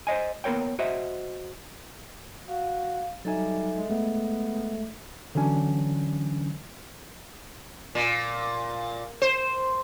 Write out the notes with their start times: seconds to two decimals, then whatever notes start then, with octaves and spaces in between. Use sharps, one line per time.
0.07 C5 C#5 D#5 G#5
0.44 A#3 B3 A#4 C#5 G5
0.79 F#4 C5 D#5 E5
2.48 F#4 F5
3.25 F#3 G3 D#4 A4 E5 G#5
3.77 G#3
3.90 G#3 A3 B3
5.35 D3 E3 F#3 C#4 D4
7.95 A#2
9.22 C5